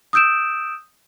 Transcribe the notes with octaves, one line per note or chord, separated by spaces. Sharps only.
D#6 E6 G6 D7 E7